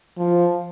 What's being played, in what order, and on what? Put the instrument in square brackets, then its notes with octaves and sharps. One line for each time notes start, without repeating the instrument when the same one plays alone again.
[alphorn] F3